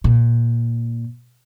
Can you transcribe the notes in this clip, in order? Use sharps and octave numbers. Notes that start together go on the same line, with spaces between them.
A#2